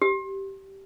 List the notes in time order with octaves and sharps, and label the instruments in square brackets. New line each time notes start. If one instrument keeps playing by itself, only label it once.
[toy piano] G4